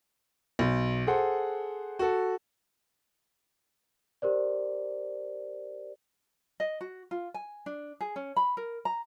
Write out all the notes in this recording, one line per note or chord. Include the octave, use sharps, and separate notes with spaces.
B1
G#4 A4 C5 F#5
F#4 A4
G4 A#4 C5 D5
D#5
F#4
F4
G#5
D4
G#4
C#4
B5
A#4
A#5